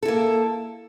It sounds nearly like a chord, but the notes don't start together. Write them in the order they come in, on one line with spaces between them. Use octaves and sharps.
A4 E4 A#3